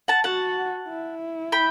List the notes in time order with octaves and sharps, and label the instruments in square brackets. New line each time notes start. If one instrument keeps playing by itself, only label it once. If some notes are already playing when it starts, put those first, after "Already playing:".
[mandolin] F#5 A5
[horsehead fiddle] F#4 [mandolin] F#5 A5
[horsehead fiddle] E4
[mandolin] G5 B5